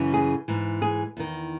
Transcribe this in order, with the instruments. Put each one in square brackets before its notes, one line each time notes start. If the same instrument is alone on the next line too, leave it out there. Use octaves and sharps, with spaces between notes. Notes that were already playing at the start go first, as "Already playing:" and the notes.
Already playing: [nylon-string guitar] F#2 C#3 E3
G#4
G#2 E3
G#4
E2 D#3